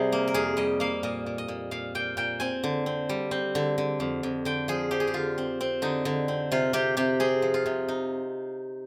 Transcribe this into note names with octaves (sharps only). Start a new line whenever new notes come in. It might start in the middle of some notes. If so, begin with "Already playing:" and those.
Already playing: C3 G3 G#4
A#3
A#4
F2 G#4
G3 D#5
A#3 F5
A#2 D#5
A#2
D#5
A#2
A#2 F5
A#2 G5
A#2 G5
C4 G#5
D3
C4
G3
C4
D3
D3
F2
F2
D3 G5
F3 G#4
F3 G4
G#4
G4
D3 F4
C4
C4
D3 D#4
D3
C4
C3 F4
C3 G4
C3 G4
C4 G#4
F3
F4
C3
D#4